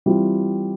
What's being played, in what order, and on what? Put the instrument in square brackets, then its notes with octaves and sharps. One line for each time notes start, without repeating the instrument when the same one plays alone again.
[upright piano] E3 G3 C4 F4